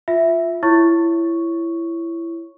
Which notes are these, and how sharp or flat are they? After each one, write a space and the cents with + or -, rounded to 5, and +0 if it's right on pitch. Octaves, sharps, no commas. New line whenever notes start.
F4 +0 E5 +0
E4 +20 C#5 +0 C#6 +0